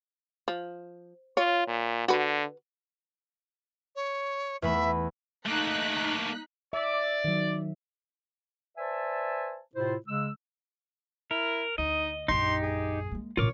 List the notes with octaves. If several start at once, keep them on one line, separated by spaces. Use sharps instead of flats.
F3
F4 C#5
A#2
D3 F#4 B4
C#5
E2 A3 E5 B5
A3 A#3 D#4 F#6 B6
D5 E5
D#3 F#3
B4 C5 D5 E5 G#5 A5
A2 C3 E4 F4 C5
C#3 G#3 E6
E4 A#4
D2 D#4 D#5
A#1 F#2 D#4 G4 C6
G#4
G#3 A#3
A1 A#2 F4 A#4 C#5 D6